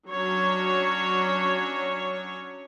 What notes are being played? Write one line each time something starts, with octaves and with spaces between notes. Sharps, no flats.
F#3 C#4 D4 C#5